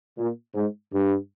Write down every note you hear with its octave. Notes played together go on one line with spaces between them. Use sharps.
A#2
G#2
G2